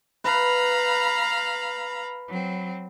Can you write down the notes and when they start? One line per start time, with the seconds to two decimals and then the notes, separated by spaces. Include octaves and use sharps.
0.24 B4 F5 A#5 B5
2.28 F#3 C4